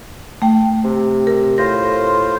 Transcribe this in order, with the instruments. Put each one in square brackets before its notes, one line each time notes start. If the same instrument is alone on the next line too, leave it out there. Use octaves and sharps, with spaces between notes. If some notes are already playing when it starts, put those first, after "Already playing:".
[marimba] A3 G5
[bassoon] C3
[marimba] A#4
[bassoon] A2 [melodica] F4 C5 [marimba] A#6